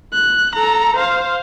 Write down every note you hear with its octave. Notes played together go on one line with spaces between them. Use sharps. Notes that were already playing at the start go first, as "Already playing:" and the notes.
F#6
A4 A#5
C5 F5